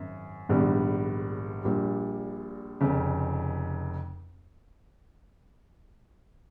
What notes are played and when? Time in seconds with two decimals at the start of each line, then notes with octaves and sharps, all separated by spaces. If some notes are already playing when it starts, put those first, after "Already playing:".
Already playing: G#1 F#2
0.49 A#1 G#2 D#3 G3 B3
1.64 A#1 A#2 G3
2.81 F1 F2 C#3